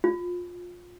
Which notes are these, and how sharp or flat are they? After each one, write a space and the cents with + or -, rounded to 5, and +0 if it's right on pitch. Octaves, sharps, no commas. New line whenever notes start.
F4 +20